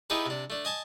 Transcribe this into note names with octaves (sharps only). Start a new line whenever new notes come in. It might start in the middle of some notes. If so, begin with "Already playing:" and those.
B3 D#4 E4 G4 G#4 B4
C3 D4
A3 D4
D#5 G#5 A5